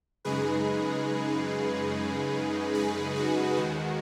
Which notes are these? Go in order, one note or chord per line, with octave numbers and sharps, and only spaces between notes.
F#2 C#3 G#3 D#4 G#4 B4
G#4 B4
F#4
D#2 D#3 G#3 F#4